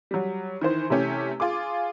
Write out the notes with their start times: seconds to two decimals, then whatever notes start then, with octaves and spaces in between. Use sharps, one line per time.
0.11 F#3 G3
0.61 D#3 E3 C5
0.90 C3 E3 A3 C#4 G4
1.40 F4 G#4 D6